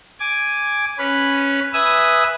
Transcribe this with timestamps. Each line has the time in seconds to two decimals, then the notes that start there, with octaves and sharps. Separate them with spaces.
0.20 G#5 D6
0.98 C#4 B4
1.74 B4 E5 G#5 D#6 E6